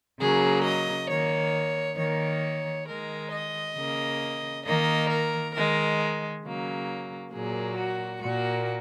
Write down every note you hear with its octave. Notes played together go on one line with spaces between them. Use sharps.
C#3 F#3 A#3 G#4
D#5
D#3 A#3 C#5
D#3 A#3 C#5
D#3 G#3 A#4
D#5
C#3 A#3
D#3 A#3 D#5
A#4
D#3 G#3 A#4
C#3 F#3 A#3
A#2 F#3 A#3 G#4
F#4
A#2 A#3 F#4